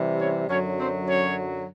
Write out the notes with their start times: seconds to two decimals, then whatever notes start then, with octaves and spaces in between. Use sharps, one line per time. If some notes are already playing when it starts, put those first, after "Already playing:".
Already playing: C3 E3 G3
0.19 C#4 C#5
0.48 F#2 D3 F#3 C#4 C#5
0.77 C4 C5
1.07 C#4 C#5